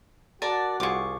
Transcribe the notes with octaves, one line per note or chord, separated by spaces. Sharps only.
F#4 A#4 D5 F#5 A5
C2 F4 G#4 C#6 D6